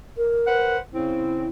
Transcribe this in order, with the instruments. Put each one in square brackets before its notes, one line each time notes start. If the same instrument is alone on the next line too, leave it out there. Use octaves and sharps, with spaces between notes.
[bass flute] A#4
[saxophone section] B4 C5 F#5
[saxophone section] C#3 C4 [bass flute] E4